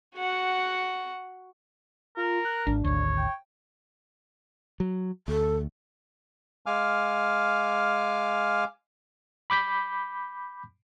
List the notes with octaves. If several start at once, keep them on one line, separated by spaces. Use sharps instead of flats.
F#4 F#5
F4 A#4
F#6
G#1 D4
G#1 D2 C#5
G5
F#3
D2 A4
G#3 F5 G#5 D6 F6
B5 D6 G6 B6